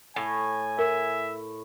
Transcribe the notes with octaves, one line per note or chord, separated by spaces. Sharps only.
A2 G#5
A#4 E5